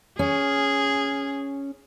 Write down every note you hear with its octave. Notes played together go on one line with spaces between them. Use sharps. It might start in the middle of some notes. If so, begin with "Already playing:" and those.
C#4 G#4